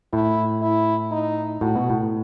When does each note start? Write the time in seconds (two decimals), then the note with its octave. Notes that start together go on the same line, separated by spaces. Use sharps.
0.13 A2 E4
0.62 E4
1.11 D#4
1.61 A2 F#4
1.76 B2
1.90 A2